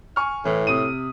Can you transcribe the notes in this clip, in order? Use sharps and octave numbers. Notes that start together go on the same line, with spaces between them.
G#5 C#6 F6
A2 E3
C3 D#6 D#7